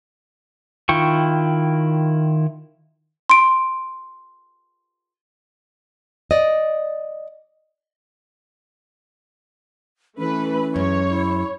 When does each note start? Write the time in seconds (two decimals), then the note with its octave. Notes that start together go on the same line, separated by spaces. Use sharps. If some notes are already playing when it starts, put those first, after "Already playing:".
0.89 D#3 E4 F4 G5 C#6
3.30 C6 D7
6.31 D5 D#5
10.18 E3 A3 C#4 B4
10.76 F#2 G#3 C#5
11.09 E4